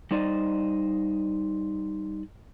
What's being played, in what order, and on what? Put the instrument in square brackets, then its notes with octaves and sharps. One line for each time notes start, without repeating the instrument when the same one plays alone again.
[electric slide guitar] G3 D#4 C5 D5 D#5